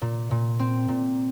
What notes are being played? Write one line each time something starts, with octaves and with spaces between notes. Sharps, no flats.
A#2
A#2
C4
A#2